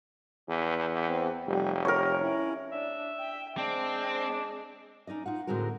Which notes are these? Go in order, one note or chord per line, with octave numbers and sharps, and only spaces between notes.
E2
C4
F1 G3
G4 A#4 C#5
C#4 E4
D4 E5
G5
G#3 C4 D4
C#4 D#4 D5 D#5
D#4 F4 F#5
A2 D3 G#3 C4 F#4 A#4